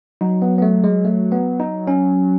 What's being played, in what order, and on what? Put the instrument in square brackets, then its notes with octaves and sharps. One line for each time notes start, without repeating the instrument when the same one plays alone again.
[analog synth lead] F#3 [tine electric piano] D#4
[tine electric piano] B3
B3
A3
G#3
A3
B3
D#4
C#4